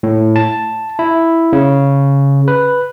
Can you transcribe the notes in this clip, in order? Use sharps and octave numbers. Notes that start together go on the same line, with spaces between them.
A2
A5
E4
C#3
B4